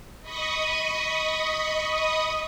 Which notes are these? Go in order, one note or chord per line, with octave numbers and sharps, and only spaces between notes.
D#5 B5 C#6 D#6